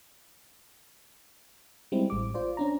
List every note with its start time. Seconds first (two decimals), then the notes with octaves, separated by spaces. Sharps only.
1.92 G3 G#3 C4 E4
2.10 A1 D6
2.34 F4 C5 D5
2.57 C#4 D4 A#5